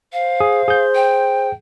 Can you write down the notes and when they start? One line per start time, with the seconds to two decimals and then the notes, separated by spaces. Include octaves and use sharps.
0.13 C5 F5
0.40 G#4
0.68 G#4 G6
0.95 G5